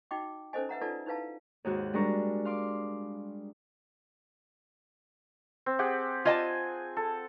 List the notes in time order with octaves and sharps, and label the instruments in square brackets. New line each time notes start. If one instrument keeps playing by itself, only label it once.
[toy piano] D#4 F#4 D#5 G5 D6
C#4 D#4 A4 C5 D#5 G#5
B4 E5 F#5 A#5
D#4 F4 A4 B4 D5 A5
D#4 E4 B4 F5 A5
[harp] D#2 G#2 F#4 F#6
G3 G#3 D4 A#4 A#5 C#6
F5 C6 D6
[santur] C4
G4 G#4 F#5
[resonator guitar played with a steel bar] F4 D#5 A5 [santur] G#5
[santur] A4